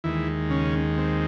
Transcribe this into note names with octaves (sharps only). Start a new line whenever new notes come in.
D#2 D#3 E3 G#3 E4
C#3 C#4
C4